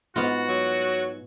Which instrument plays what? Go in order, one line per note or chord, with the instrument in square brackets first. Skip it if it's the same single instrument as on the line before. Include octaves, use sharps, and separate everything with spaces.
[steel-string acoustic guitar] G#2 [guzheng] B3 F4 [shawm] F#4
[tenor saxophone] F#3